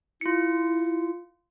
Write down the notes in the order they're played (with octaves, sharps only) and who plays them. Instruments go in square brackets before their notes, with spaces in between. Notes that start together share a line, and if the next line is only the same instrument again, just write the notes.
[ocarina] E4 [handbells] F4 C#7